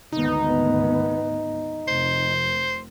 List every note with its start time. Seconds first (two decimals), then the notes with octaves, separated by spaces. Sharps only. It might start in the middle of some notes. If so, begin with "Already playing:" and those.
0.13 G#1 D2 B3 D#4
1.88 F1 C5